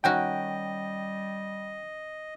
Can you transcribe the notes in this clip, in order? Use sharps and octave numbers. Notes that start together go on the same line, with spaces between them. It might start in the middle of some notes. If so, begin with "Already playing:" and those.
D#3 G3 C#4 F#4 D#5 G5